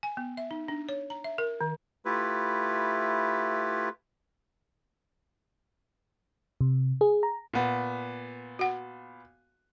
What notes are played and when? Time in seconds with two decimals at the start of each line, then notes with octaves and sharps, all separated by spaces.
0.03 G#5
0.17 B3
0.37 E5
0.51 D#4
0.68 D4
0.89 C#5
1.10 A#5
1.24 E5
1.38 A#4
1.61 D#3
2.05 A3 E4 F4 G4 B4
6.61 C3
7.01 G#4
7.23 A#5
7.53 A#2 B3
8.59 F#4 F#5